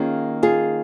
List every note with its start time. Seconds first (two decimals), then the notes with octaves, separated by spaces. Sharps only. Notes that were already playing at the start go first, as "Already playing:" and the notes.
Already playing: D#3 A#3 C#4 F4 G#4
0.43 F4 G#4